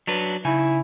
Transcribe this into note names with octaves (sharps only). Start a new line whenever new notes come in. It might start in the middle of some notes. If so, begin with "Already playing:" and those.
F#3 D4 B4
C#3 D#4 E4 G#5